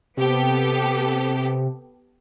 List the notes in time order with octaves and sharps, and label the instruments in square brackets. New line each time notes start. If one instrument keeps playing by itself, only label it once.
[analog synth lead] C3 [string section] B3 G4 A4